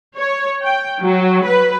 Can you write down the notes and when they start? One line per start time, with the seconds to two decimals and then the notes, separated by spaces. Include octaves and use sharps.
0.17 C#5
0.64 G5
1.02 F#3
1.45 B4